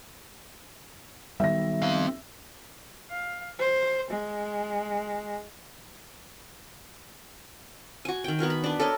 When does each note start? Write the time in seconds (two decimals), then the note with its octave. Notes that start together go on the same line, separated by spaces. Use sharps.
1.40 B1 D#3 G3 E5 A#6
1.82 C4 F5
3.11 F5
3.59 C5
4.10 G#3
8.05 F#4 G#5
8.24 D#3 G5
8.39 B3 F#4 A#4 G#5
8.50 B5
8.64 D4 B4
8.80 A4 A#4 C#5 D#5